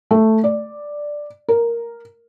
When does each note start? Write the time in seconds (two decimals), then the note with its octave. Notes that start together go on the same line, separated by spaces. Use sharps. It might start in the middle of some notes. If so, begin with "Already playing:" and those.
0.11 A3
0.44 D5
1.48 A#4